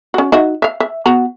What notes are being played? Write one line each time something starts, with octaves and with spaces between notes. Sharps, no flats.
C#4 F#4
D#4 F#4 E5
E5 F5
E5
B3 F#4 A#5